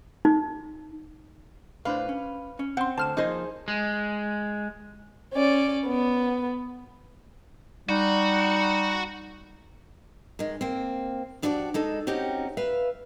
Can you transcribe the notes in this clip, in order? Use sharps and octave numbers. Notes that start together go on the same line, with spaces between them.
D#4
A2 D4 B4 C5 F5
C#4
C#4
C4 F#5 C6
D2 D3 C5 A5 F6 E7
F3 A#3 D#4 G#4 C5 D#5
G#3
C#4 D5
B3
G3 D#4 F#4
D#3 G#3
A#3 C4
F3 D4 E4 F#4 G4 D5
G#3 D#4 A4
C4 C#4 D#4 F#4 G4
B4 E5 F5